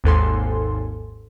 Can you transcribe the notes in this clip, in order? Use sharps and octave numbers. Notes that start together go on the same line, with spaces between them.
G#1 D#2 G#2 A4 G#5 C6